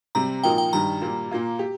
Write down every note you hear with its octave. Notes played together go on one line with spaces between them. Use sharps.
C3 G3 C4 A#5
A#2 F3 D#4 A#4 G5
G5
G2 D#3 G3 A#5
A#2 G3 A#3
A#2 A#3 F4
G4